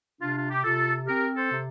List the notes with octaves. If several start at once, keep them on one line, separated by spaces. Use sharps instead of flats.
C3 D4 F4
F4
G4
C3 F4 A4
C4 G4 A#4
A4 C5
C3